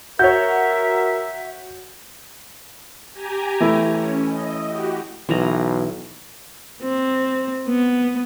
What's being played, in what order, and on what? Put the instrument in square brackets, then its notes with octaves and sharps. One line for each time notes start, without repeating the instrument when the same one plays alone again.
[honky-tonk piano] F#4 C#5 [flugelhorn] A#4 [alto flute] E5 [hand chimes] G6
[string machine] G4 G#5 A#5
[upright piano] E3 A3 E4
[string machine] C#4
D#5
F#4 G4
[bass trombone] B1 [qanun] E3 A#5
[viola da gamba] C4
B3